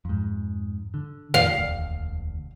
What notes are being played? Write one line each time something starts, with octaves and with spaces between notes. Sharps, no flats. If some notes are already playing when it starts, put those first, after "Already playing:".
F2 G#2
D3
F2 D#3 F3 F5
E1 D2